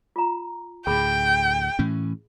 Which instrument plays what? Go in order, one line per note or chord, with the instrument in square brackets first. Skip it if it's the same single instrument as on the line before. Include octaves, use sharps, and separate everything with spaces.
[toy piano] F4 A#5
[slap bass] D2 A2 [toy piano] G#4 B5 [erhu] G5
[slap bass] A2 E3 C#4